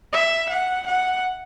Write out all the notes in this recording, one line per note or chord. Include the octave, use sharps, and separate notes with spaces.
E5
F#5
F#5